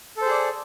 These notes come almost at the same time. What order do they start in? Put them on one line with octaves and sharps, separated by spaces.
A4 C5 G#4 D5